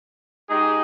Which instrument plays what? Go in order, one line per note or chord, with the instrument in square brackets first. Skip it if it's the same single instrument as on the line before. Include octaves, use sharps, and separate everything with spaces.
[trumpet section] G#3 D#4 G4 G#4